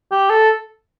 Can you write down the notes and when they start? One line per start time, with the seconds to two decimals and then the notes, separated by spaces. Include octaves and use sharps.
0.12 G4
0.30 A4